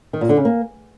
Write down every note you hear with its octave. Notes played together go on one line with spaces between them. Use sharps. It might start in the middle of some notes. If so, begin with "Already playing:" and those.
D#3
A#2
D3
C#3
A#3